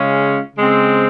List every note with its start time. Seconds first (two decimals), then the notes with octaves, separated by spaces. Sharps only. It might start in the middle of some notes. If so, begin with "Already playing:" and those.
Already playing: C#3 G#3 C#4 F4
0.56 C#3 G#3 C4